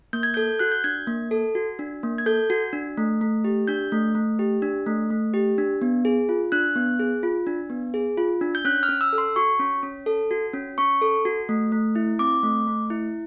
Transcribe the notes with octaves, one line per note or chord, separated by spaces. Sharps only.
A#3 G6
G#6
A4 G6
F#4 F#6
G6
D4 G#6
A#3
A4
F#4
D4
A#3
G#6
A4 G6
F#4
D4
A3
A3
G4
D4 G6
A3
A3
G4
D4
A3
A3
G4
D4
B3
G#4
F4
D4 F#6
B3
G#4
F4
D4
B3
G#4
F4
D4
G6
C#4 F#6
F6
C#4
E6
A4
C6
F#4 C#6
C#4
C#4
A4
F#4
C#4
C#4 C#6
A4
F#4
A3
A3
E4
C4 D6
A3
A3
E4